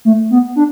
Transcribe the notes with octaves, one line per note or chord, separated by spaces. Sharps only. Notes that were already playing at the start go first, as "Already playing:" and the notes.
A3
B3
D4